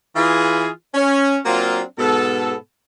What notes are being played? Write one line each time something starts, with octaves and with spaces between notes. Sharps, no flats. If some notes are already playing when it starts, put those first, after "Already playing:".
E3 F4 G#4
C#4
F#3 A#3 C4 D4 F4
G#2 B2 B3 A4